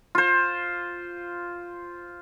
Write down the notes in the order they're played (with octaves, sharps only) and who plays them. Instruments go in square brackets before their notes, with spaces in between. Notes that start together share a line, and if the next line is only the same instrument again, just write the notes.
[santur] F4 C5